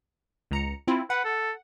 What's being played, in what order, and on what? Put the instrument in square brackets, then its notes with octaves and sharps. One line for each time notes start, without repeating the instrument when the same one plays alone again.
[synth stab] C#2 A#5 C#7
C4 E4 F4
[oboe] B4 [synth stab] F#5
[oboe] A4